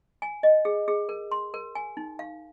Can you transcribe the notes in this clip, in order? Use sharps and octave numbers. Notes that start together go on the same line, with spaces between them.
G#5
D#5
G#4
G#4
A#4
C6
A#4
G#5
D#4
F5